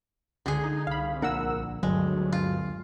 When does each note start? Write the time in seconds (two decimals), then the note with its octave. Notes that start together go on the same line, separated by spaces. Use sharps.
0.46 C#2 D3 G#4
0.64 D#4
0.87 C2 F5 B5
1.22 A#1 A#3 D4 A#4 F#5 E6
1.83 G1 D2 G2 F#3 G#3
2.32 F4